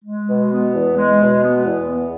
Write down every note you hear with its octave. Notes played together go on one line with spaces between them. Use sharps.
G#3
B2
B3
E2
G#3
B2
B3
E2
B3